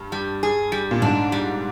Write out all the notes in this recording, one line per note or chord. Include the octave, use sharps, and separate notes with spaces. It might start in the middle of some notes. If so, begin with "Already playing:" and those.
Already playing: G2
G3
G#4
G3
A#2
G#2 D4
G3